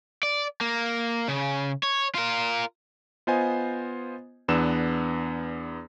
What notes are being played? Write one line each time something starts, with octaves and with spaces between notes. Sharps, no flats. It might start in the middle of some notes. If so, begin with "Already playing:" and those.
D5
A#3
C#3
C#5
F4 A#4
B3 F4 C5 D#5 G#5
E2 B3 D4 E6 E7